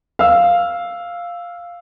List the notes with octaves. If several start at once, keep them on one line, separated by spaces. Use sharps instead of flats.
F5 E6